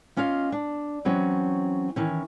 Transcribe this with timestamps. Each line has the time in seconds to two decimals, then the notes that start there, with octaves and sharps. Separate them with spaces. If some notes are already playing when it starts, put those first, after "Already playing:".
0.16 A#3 C#4 F4 D#5 F5
0.52 D4
1.05 E3 F#3 C4 C#4
1.96 D#3 E3 C#4